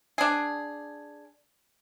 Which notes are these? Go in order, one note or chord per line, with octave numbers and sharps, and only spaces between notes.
D4 G#4